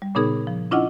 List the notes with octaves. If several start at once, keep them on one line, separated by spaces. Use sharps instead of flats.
G3
A#2 C#3 B3 D#4 G#4 A#4
F3
C#4 D4 E4 F4 D#5 F#5